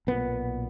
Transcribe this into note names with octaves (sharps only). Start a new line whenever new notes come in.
B1 A#2 B3